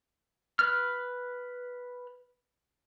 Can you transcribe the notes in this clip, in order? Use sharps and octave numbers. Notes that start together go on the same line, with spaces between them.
B4 F6